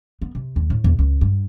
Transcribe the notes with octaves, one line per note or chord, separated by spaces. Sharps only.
B3
C3
D#2
A2
E2
C#2
G2